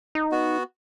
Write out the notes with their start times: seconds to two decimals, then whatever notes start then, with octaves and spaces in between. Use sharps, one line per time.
0.15 D#4
0.32 B3 F#4